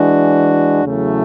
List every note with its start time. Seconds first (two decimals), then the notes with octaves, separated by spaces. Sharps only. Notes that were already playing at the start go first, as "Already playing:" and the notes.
Already playing: E3 G#3 D4 F#4
0.84 E2 C#3 F#3 A3 E4